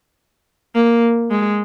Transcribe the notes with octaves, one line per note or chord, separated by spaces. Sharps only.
A#3
G#3